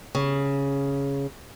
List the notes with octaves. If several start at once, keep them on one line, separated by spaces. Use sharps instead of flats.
C#3